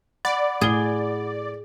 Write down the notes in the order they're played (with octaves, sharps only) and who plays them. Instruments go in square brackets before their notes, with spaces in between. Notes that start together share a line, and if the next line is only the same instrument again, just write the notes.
[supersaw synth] D5 [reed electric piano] F#5 B5
[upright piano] A2 G7 [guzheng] G#4